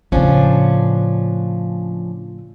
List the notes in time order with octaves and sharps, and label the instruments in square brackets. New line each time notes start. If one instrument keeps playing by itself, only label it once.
[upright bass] A2 C#3 [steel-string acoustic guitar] F3 C#4 D4